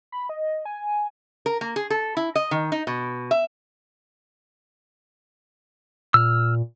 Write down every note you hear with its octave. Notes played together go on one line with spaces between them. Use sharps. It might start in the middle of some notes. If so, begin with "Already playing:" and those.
B5
D#5
G#5
A#4
A#3
G#4
A4
E4
D#5
D#3
D#4
B2
E5
A#2 E6 F6